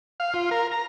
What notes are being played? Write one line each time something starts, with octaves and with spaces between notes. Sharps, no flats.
F5
F4
A#4
A#5